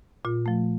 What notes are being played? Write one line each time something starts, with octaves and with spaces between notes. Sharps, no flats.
A#2 F4
F3 A3